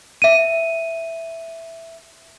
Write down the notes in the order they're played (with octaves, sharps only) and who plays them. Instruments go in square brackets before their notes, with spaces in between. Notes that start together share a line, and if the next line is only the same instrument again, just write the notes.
[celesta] E5 D#7